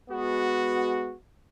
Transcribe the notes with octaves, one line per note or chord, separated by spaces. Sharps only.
G#3 B3 F#4